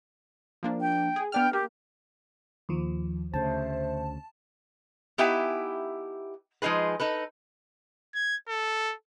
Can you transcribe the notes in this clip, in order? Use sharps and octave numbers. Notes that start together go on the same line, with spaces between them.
F3 A#3 D4
G5
G#4
B3 D4 G5 F6
A#3 G4
D#2 F3
D2 C#3 A3 C5 A5
B3 D#4 E4 G4 E5 G#5
F3 G#3 D#4 G#4 B4
D#4 A4 B4
G#6
A4